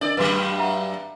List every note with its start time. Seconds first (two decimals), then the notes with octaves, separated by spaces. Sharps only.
0.01 D4 A#4 D5 D#5
0.17 G2 F#3 B4 F5 C6
0.58 E5 F#5 A#5